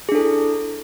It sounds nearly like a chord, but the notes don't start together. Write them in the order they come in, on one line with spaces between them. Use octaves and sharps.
G#4 D4 A4 E4